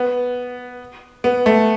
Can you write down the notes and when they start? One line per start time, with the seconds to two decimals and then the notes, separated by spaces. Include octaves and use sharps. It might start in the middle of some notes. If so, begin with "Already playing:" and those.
Already playing: B3
1.24 B3
1.46 A3